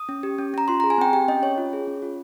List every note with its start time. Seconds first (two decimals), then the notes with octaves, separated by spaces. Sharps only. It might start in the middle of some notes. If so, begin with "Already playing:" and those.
Already playing: D#6
0.09 C#4
0.23 G4
0.38 C#4
0.54 C#4 A#5
0.68 F4 C6
0.80 A#5
0.84 G#4
0.90 G#5
0.98 C4 G5
1.13 G4 G5
1.28 C#4 D#5
1.42 C#4 C#5
1.58 F4
1.73 G#4
1.87 C#4
2.02 F4